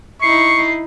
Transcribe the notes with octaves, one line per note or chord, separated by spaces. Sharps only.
D#4 E4 C#6 C7